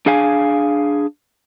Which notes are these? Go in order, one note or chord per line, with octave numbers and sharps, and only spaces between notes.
D4 G#4 F5 G#5